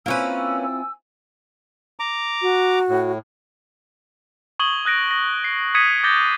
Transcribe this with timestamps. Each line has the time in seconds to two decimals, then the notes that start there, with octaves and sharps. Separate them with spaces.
0.06 A#3 C4 C#4 E4 F4 B4 G#5 E6
2.00 A#5 D6
2.42 F#4
2.89 A2
4.59 C#6 D#6 G#6 F#7 G7
4.85 D#6 F#6 A#6 D7
5.11 A#6
5.44 C7
5.75 D#6 G#6 B6 C#7 D#7
6.04 D6 G6 A6 A#6 G7